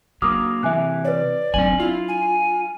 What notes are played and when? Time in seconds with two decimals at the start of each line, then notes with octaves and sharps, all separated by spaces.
0.22 F#3 A#3 D4 D6 D#6 F6
0.63 C3 E3 E5 G#5 F#6
1.05 B4 C#5 D5
1.54 F#3 C4 D4 G#5 F#7
1.80 E4 F4
2.08 G#5